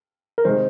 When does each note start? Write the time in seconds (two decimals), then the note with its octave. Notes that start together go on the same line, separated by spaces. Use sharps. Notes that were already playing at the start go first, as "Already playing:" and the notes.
0.38 A#4
0.45 C3 D#3 G#3 D#4 C5